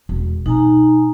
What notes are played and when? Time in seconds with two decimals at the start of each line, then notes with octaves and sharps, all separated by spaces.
0.09 E1
0.46 B2 D#4 G#5 A#5